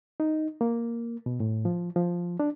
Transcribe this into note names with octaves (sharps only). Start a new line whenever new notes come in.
D#4
A#3
B2
A2
F3
F3
D4